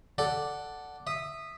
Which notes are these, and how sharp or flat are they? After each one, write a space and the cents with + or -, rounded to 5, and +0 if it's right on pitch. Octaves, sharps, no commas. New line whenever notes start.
A4 +0 D5 +0 F#5 +0
E5 -5 D#6 -15